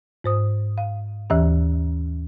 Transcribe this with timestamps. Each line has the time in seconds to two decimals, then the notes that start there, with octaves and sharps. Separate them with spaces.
0.24 G#2 C5 D#6
0.78 F5
1.30 D#2 E3 C#4 G4